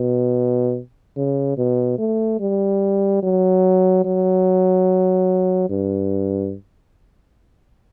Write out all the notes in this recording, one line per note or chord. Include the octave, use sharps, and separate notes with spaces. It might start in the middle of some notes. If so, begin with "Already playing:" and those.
Already playing: B2
C#3
B2
A3
G3
F#3
F#3
G2